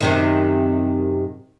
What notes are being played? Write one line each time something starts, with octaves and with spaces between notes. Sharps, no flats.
F#2 C3 D#3